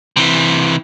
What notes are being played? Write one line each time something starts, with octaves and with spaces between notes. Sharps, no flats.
C3 E3